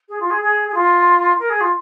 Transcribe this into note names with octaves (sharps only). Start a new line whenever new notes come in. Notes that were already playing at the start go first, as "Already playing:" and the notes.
G#4
F4
G#4
G#4
G#4
F4
A#4
G#4
F4